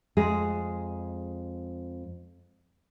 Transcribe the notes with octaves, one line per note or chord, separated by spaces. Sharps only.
F2 G#3 G#4